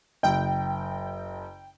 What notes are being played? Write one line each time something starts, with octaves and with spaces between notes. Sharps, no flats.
F#1 G5